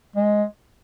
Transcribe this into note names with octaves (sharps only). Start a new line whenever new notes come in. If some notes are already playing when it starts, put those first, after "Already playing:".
G#3